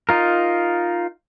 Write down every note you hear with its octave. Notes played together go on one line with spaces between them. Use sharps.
D#4 F4 A#4